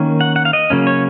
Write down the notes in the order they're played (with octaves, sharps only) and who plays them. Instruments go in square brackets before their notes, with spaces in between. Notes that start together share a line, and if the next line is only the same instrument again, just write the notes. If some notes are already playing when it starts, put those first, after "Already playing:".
Already playing: [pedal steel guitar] D#3 A#3 C#4
F#5
F#5
F5
D#5
C#3 F#3 A#3 C#4
C#5